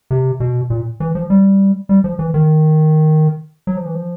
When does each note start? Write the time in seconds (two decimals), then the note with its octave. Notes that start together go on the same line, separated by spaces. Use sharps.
0.11 C3
0.40 B2
0.70 A#2
1.00 E3
1.15 F3
1.30 G3
1.89 G3
2.04 F3
2.19 E3
2.34 D#3
3.67 F#3
3.77 F3
3.86 E3
3.95 F3